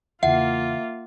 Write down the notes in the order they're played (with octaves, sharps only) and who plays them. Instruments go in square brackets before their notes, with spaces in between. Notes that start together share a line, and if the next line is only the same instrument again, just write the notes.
[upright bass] E2 C#3 [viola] A#3 F4 [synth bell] E5 [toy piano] F#5